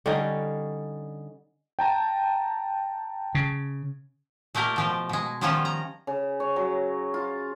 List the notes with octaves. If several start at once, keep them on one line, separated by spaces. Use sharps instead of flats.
D3 G3 C#4 D#4
G5 A5 A#5
C#3
A#2 A3 A#3 G4 A#4
B2 F3 G4
B2 G#3
D#3 F3 G3 B3 C#4 F4
A#5
C#3
C#5
F#3
F4